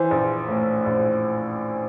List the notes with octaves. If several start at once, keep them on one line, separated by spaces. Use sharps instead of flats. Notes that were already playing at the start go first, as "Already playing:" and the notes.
Already playing: E3 C5
A#1
A2
A#1